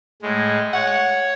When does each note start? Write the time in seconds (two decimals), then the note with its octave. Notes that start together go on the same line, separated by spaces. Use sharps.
0.22 A2 G#3
0.73 C#5 F#5